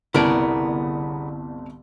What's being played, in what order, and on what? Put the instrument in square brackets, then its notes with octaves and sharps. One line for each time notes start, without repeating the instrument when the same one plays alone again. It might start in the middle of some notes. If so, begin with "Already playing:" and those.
[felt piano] G1 C2 A5 [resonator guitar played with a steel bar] C#3 B3 A#4 [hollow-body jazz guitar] E4 D5